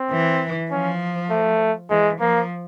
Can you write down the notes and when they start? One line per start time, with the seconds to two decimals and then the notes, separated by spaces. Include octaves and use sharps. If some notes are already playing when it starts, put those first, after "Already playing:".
Already playing: C4
0.11 E3
0.71 F3 C#4
1.30 A3
1.90 E3 G#3
2.20 F3 A#3